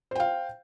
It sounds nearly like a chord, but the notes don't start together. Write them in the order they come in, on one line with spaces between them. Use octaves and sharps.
C5 G5 F5